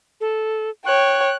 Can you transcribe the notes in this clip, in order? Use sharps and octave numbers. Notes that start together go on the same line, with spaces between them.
A4
C#5 G5 F#6